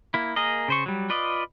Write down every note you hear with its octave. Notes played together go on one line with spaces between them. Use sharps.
A#3 E4
A#3 G#4 A#4 D#5
C#3 C5 C#6
F#3 G3
F4 B4 D5 D#5